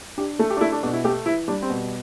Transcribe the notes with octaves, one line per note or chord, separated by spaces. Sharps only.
D4 G4
A3 A4
G4
D4
A3 E4
D4
B2 D4
E4
A3 G4
E3 E4
G3 D4
C4
B2